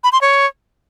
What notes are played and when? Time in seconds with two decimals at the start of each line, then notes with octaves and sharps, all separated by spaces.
0.04 B5
0.12 C6
0.21 C#5